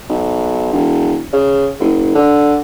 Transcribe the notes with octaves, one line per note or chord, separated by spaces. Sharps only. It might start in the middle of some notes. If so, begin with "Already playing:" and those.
B1
E1
C#3
F#1
D3